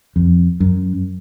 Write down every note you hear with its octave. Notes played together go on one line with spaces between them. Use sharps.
F2
F#2